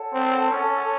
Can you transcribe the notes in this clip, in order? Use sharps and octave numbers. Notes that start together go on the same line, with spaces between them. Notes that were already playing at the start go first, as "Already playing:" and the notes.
Already playing: A4 C#5 F#5 A5
C4
C#4